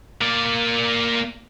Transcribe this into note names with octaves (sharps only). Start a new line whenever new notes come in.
A#3 D5